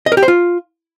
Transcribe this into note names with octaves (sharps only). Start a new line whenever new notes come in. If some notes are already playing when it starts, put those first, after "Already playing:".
D#5
A#4
G4
C5
F4